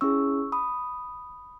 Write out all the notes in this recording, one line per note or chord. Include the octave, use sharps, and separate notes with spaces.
C#4 E4 G#4 C#6 E6
B5 D#6